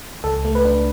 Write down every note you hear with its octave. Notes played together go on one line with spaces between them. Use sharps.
C#2 A4
A3
B4
D4